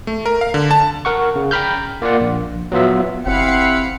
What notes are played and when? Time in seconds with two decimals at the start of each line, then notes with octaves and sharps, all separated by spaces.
0.07 A3
0.26 A#4
0.41 F5
0.54 D3
0.71 A5
1.05 A#4 F#5 C#6
1.36 C#3
1.51 G5 A#5 B5 F6 G6
2.02 A#3 F4 D5 F#5
2.21 A#1
2.72 F#3 B3 F4 E5
3.26 G1 C4 E4 G4 F5 F#5 B5 C#7